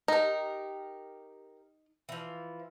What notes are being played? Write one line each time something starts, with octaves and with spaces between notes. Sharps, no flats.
D#4 G4 A#4
E3 F3